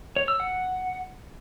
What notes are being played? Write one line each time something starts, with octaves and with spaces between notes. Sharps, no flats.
C#5
E6
F#5